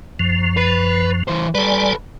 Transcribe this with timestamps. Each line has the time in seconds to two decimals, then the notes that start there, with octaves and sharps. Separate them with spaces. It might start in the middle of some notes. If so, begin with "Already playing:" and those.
0.19 F#2 F3
0.57 B4
1.28 E3 C5
1.55 G3 A4 B4 D5 G#5